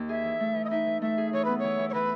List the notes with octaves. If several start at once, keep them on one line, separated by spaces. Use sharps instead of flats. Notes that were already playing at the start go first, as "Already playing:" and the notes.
Already playing: D#2
G#4 E5
E3
A3
E3
D#5
D#4 E5
E3
A3 E5
G#4
E3 C#5
B3 B4
C#5
E3
E3
C#5
E3 B4